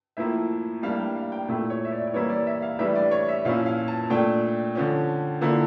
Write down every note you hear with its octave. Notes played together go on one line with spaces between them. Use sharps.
A2 F3 A#3 E4 E5
A2 G3 A#3 D4 F5
G5
F5
G5
A#2 A3 E4 G5
C#5
E5
D5
D5
E3 G3 A#3 E4 C#5
D5
E5
F5
A2 E3 G3 D4 E5
D5
C#5
E5
A#2 F3 C#4 E4 F5
F5
A5
A#2 A3 D4 G5
D3 F3 C#4
D3 F3 A#3 E4